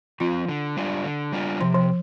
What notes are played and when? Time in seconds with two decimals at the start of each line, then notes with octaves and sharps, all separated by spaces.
0.20 F3 C4 F4
0.49 D3
0.77 G3 D4 F4
1.04 D3
1.32 G3 D4 F4
1.61 C3 F3
1.75 F3